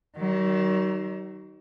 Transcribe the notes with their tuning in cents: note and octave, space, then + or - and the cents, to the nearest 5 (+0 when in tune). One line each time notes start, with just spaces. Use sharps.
D#3 +0 F#3 +40